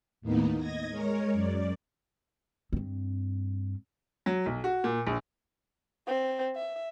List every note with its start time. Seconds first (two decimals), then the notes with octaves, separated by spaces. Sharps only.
0.21 D#2 A2 A#3 B3 D#4
0.57 D#5 G#6 A#6
0.89 G#3 A#4 C#5
1.33 F#2 D5
2.73 G2 C4
4.26 F#3
4.46 B1
4.64 F#4
4.84 A#2
5.07 A#1
6.07 C4
6.55 E5